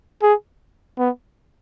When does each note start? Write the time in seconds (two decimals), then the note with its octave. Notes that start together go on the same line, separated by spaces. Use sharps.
0.22 G#4
0.98 B3